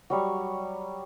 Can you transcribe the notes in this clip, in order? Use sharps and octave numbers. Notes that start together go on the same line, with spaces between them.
F#3 G3 C#6